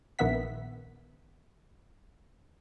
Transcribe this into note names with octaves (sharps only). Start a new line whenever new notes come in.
A#1 D#3 B3 E5 F#5 B6